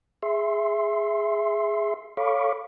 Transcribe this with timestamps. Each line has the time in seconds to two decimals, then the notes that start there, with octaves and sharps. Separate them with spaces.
0.23 G#4 E5 C6
2.17 A4 C#5 F5 B5 C#6 D6